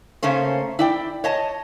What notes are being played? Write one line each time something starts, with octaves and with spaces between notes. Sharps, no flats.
C#3 A3 A#3 C#4 C5
E4 D5 G5
C#5 D#5 A5